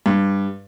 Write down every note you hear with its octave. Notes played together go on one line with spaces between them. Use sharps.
G2